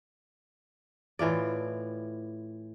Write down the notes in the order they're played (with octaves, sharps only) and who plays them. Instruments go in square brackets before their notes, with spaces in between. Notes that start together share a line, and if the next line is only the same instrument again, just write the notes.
[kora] A2 E3 F4 D5